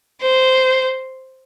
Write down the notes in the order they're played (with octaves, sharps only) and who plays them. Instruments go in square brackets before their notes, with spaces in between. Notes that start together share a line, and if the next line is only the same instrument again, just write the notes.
[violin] C5